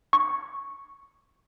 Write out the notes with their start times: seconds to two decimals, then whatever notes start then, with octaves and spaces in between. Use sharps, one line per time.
0.13 C#6